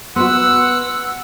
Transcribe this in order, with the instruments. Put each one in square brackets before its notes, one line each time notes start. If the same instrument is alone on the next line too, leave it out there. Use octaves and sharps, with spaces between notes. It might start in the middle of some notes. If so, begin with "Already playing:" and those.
[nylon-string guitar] B3 F#4 [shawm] F#5 [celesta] C6 F#6 [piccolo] E6